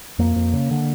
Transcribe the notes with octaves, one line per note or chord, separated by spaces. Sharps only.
F2 A#3
F2
C#3
D3